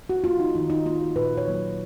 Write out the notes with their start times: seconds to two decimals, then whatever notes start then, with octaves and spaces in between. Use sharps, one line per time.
0.10 F#4
0.24 A#3 F4
0.40 D#4
0.55 D#3 D#4
0.70 D#4
0.86 A#3 F4
1.01 F#4
1.16 A#2 B4
1.37 C#5
1.48 F#3 A#3